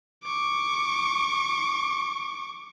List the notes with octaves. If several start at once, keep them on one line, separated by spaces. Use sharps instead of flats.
C#6 D6